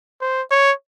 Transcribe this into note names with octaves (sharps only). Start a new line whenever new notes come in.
C5
C#5